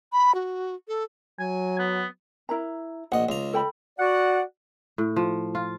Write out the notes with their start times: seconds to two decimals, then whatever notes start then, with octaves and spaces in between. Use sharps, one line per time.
0.12 B5
0.35 F#4
0.88 A4
1.40 F#3 G#5
1.79 B3
2.49 E4 A#4 A#5
3.12 A#1 D#5 F#5
3.29 C#2 F5 A#5
3.53 A4 G5 B5
3.99 F#4 D5 F#5
4.98 A2
5.16 F3
5.55 F4